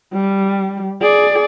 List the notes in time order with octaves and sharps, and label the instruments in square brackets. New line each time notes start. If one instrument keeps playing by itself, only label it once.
[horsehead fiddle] G3
G#4 D5